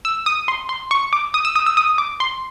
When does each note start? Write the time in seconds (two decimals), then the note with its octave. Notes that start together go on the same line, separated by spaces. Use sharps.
0.05 E6
0.26 D#6
0.48 C6
0.69 C6
0.91 C#6
1.13 D6
1.34 D#6
1.45 E6
1.56 D#6
1.66 E6
1.77 D#6
1.98 D6
2.20 C6